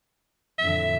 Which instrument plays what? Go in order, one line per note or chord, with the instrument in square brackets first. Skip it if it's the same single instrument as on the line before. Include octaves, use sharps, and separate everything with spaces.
[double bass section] F2 A2 D3 [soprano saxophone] E5